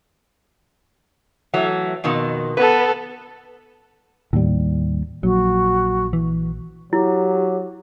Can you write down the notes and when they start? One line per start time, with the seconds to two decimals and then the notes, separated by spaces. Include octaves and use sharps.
1.54 E3 F#3 A3
2.04 F2 B2 D#3
2.57 B3 A4 B4
4.33 D#2 A2 G3
5.23 A#1 F#3 F#4
6.13 E3
6.93 F#3 E4 G4